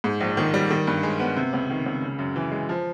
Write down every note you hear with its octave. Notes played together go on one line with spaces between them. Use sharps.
G#2
A#1
D#3
G3
D#3
G2
G#3
B3
C3
C#2
D#3
C#2
C#3
F#2
E3
G#3
F3